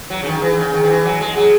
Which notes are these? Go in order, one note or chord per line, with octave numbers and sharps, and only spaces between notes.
F#3
C#3
D#3
E3
C#3
D#3
D#3
E3
F#3
G#3
F#3